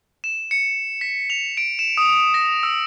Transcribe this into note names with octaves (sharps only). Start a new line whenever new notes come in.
E7
C#7
B6
F7
D7
E7
D#6
A#6
E6